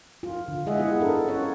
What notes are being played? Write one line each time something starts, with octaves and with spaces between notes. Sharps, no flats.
F4
D3
G#3 F4 G#4 D#5 E5 F#5
B3 E4 G4 F#5
D4 A4 A#4
C#4 F4 C#5 F#5